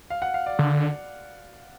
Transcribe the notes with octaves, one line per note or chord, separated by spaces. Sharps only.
F5
F#5
F5
D5
D3